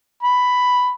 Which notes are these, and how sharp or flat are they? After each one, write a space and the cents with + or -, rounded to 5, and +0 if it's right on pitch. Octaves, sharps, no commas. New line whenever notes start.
B5 +5